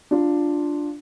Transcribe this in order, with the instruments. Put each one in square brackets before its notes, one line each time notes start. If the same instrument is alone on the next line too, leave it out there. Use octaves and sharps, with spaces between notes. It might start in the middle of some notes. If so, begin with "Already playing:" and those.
[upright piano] D4 F4